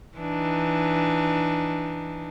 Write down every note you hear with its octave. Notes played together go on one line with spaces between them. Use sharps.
E3 D4 D#4